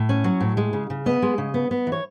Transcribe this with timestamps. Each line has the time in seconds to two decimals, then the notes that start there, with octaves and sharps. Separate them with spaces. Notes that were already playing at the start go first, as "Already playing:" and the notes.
Already playing: A2
0.09 C#4
0.24 F#3
0.41 A2
0.57 G#3
0.73 C#3
0.90 C#3
1.06 B3 D#5
1.22 G#3
1.38 C#3
1.54 B3
1.71 B3
1.87 E3
1.92 C#5